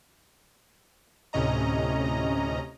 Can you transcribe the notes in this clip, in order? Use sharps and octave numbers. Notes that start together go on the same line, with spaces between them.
D2 A2 C3 C#4 D#5 A#5